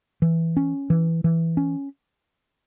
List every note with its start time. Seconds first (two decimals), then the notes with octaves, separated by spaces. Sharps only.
0.22 E3
0.57 C#4
0.90 E3
1.24 E3
1.57 C#4